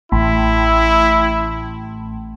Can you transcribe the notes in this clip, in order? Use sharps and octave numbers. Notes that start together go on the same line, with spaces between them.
A1 E4